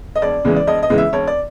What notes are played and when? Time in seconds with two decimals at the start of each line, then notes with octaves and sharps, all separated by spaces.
0.16 D#5
0.22 E1 D5
0.45 E2 C#3 E3 G#3
0.56 D5
0.67 E1 D#5
0.83 D#5
0.90 E2 C#3 E3 G#3
0.98 E5
1.13 E1 C#5
1.27 D5